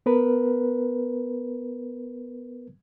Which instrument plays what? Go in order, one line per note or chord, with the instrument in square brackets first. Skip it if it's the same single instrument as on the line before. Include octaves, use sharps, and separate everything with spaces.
[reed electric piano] B3 A#4 B4